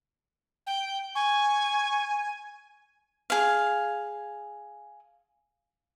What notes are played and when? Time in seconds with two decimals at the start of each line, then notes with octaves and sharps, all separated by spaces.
0.67 G5
1.15 G#5 C#6
3.30 G#4 F5